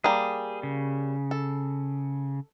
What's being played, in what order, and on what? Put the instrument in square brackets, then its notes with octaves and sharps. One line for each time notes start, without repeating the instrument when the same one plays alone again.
[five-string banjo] G3 A#3 [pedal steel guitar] G#4
[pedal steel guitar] C#3
[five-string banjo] A4